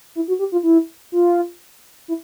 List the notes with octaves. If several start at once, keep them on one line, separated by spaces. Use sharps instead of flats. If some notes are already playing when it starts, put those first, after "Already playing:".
E4
F#4
G4
F4
E4
F4
E4